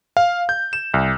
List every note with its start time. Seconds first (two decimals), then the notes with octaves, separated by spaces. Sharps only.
0.17 F5
0.49 G6
0.73 E7
0.94 C2